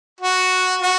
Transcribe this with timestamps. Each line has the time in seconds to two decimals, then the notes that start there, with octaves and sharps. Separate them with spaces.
0.21 F#4
0.81 F#4